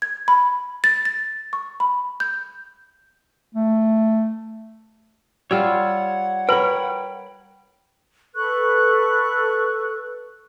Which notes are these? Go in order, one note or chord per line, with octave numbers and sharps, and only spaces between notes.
G#6
B5
A6
A6
C#6
B5
G6
A3
G3 F4 C#5 F#5 E6
A#4 B4 C#5 G5 B5
A4 B4 C#6 F#6